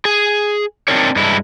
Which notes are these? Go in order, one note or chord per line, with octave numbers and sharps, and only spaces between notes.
G#4
C4 D4 D#4 A#4 C#5
G2 G#3 E4